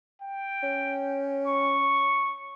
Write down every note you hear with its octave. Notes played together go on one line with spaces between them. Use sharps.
G5
C#4
C#6